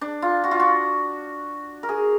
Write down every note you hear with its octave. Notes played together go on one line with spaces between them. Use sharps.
D4
F4
F#4
F4
F#4
A#4
G#4